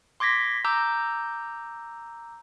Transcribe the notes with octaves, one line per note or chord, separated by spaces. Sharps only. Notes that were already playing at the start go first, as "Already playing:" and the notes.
C6 D6 G#6 A#6 B6
A#5 D6 E6 G6